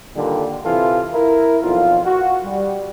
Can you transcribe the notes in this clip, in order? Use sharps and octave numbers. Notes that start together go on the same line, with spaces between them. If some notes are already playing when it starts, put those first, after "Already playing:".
A#2 D3 D#3 G3
C3 E3 E4 F4 A4
E4 A#4
B1 F2 F4
F#4
G3